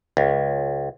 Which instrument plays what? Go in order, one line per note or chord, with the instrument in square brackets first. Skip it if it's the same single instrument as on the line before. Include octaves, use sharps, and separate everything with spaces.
[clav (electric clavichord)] C#2